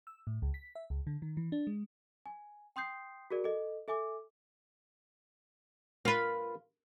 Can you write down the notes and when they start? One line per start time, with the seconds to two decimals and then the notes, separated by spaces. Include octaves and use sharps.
0.07 E6
0.27 A2
0.42 C#2
0.54 B6
0.75 E5
0.90 C#2
1.07 D3
1.22 D#3
1.37 E3
1.52 D4
1.67 G#3
2.26 G#5
2.76 G5 C6 D#6 G6 C7
3.30 F#4 G#4 A#4 D5
3.44 A4 D#5
3.88 A4 E5 G#5 D6
6.05 F4 A#4 B4